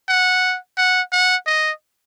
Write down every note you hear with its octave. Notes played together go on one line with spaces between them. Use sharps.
F#5
F#5
F#5
D#5